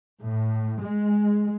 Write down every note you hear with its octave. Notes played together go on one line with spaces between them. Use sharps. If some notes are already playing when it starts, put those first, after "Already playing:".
A2
G#3